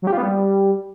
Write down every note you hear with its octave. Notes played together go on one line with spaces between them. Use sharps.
F#3
G4
F4
B3
G3